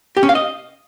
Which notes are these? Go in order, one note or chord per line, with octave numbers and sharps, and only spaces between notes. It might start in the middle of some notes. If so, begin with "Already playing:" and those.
G4
C#4
F5
D#5